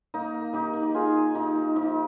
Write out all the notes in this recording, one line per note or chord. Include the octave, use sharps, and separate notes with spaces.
A#3 D#4
A#3
D#3 D#4 G4
D#3
G4
A#3 F4 G#4
D#3
D#3 D#4 G4
A#3
F3 D#4 G4